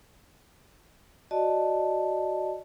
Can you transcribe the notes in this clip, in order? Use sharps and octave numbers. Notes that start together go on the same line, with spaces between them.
F#4 D5 D#5 A5